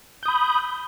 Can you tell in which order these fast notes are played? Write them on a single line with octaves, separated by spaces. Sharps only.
G6 D#6 B5